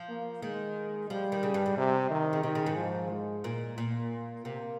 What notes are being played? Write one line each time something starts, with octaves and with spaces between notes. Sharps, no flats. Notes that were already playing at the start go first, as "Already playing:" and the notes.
Already playing: F3
A#3
D#3 G#3
F3 G3
D#3
C#3
G2
G#2
C3
D#3
C#3
C3 D#3
C#3
G#2
F3
G#3
A#2
A#2
C3 A#3